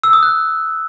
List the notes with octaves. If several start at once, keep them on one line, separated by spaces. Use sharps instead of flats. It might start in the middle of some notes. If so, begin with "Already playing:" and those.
E6
D#6
F#6